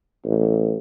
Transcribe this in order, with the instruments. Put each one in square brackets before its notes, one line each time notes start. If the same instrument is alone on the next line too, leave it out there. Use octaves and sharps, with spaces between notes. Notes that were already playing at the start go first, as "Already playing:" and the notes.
[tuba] A1